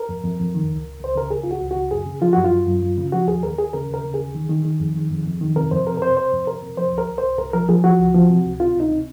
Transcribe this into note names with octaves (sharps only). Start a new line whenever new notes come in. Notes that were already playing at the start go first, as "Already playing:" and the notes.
Already playing: A#4
F2
F2
F2
D#3
C#2
C#2
C#2 C5
C#3 A#4
C#3 G#4
C#2 F4
F#4
C#2
F#4
C#3
F#2 G#4
C#3
F3 F4
F#2 F#4
F4
F#2
F#2
F#2
C#3
F3 F#4
D#2 G#4
D#2 A#4
D#2 G#4
C#3 A#4
D#2 A#4
C#3
G#4
D#2
D#3
D#3
D#3
F2
D#3
F2
F2
D#3
C3 A#4
F2 C5
C3 A#4
A#4
C3 C5
C3 C5
F2
F2 A#4
C3
F3 C5
C2
A#4
C2
C5
C2
C2 A#4
F3 A#4
F3 G#4
F3 F#4
C#2
F3
C3
C#2
C3 F4
C#2 D#4
C3